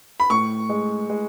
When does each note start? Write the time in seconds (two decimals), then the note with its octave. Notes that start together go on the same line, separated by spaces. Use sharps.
0.20 B5
0.30 A2 C#6
0.69 G#3
1.10 G#3